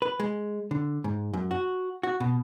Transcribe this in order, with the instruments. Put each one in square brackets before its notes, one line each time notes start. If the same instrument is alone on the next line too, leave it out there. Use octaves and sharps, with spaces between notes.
[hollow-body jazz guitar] B4
G#3
D3
G#2
F#2
F#4
F#4
B2